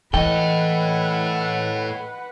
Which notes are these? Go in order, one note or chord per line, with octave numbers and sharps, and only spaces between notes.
A2 E3 A4 B4 D#5 F#5 G5